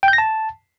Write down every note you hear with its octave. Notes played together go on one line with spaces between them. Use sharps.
G5
G6
A#6
A5